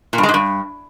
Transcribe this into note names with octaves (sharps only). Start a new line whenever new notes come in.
A#2
G2
G#3
G#2
G2